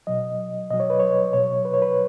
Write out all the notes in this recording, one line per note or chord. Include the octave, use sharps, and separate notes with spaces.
B2 F#3 D#5
B2 F#3 D#5
C#5
B4
C#5
B2 F#3 C#5
B4
C#5
B4